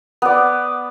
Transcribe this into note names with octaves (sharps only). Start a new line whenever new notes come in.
B3 D5